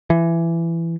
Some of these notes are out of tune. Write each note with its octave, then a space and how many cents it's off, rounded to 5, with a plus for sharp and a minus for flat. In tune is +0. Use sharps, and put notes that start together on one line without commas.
E3 +20